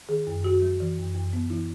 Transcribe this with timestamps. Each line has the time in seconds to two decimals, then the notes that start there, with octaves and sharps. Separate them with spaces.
0.09 D#3 G#4
0.27 F#2
0.44 F#2 F#4
0.62 F#3
0.80 E3
0.98 F#2
1.15 F#2
1.33 B3
1.50 E3 E4